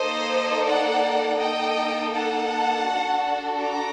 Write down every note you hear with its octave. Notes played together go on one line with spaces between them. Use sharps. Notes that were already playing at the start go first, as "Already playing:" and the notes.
Already playing: A#3 D#4 A4 C5 D#5
D5 F#5
A#3 D#4 A4 D#5 G5
F#5 A5
D4 F#4 A4
A#5 D6